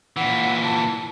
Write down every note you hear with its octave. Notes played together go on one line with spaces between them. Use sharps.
A#2 E3 F#5
A5